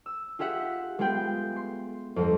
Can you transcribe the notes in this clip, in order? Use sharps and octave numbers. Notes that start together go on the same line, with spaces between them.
E6
F4 G4 G#4 E5 F#5
G#3 B3 F4 G#4 G5
C6
G1 F2